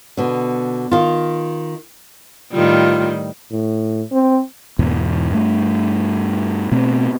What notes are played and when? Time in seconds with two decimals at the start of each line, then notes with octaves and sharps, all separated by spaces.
0.17 B2 D3
0.91 D#3 F4
2.52 A2 D#3 G3 F4
3.51 A2
4.12 C4
4.79 E2 G#2 B2 E3
5.32 G2 A3
6.72 B2 A3 B3 C4